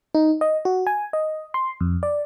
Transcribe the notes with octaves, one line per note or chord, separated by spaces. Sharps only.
D#4
D#5
F#4
G#5
D#5
C6
F2
D5